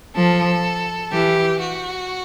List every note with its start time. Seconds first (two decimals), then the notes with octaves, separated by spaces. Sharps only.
0.16 F3 A4
1.12 E3 G4
1.60 F#4